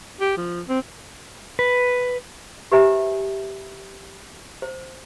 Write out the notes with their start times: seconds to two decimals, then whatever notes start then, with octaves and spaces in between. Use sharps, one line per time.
0.21 G4
0.37 F3
0.68 C4
1.59 B4
2.72 G4 B4 C5 E5 G#5 A#5
4.62 C5